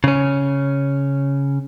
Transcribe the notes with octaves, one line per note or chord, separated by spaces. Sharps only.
C#3 C#4